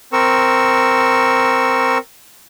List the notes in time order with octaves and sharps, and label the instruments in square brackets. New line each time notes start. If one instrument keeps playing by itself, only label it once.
[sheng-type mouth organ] C4 A#4 C#6 E6